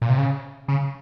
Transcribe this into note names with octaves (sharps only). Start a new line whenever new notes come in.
A#2
C3
C#3
C#3